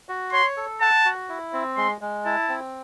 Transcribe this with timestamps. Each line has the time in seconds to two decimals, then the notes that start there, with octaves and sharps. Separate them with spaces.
0.09 F#4
0.32 C#5 C6
0.57 A4
0.81 F#5 A5
1.05 F#4
1.29 E4
1.53 C4
1.77 G#3 C6
2.01 G#3
2.25 E4 A5
2.49 C4